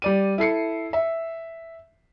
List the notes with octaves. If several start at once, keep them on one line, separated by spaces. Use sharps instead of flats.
G3 D5 D#7
E4 A4 C7 C#7
E5